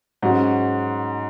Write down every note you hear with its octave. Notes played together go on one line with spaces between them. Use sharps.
G#2 F#3 C#4 F#4